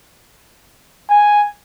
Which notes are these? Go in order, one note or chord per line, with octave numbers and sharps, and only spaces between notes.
G#5